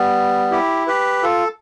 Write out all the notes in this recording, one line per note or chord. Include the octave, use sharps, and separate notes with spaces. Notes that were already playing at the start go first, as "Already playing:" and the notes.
Already playing: G3 B3
E4 G4
G4 B4
F4 A4